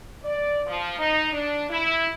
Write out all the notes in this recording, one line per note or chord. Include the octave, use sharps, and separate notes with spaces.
D5
F3
D#4
D4
E4